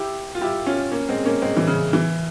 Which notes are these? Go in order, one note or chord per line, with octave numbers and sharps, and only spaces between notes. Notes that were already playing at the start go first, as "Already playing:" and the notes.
Already playing: E4 G4
F4
E4 G4
C#4 F4
A#3 C#4
G#3 C4
A#3 C#4
G#3 C4
E3
C#3
E3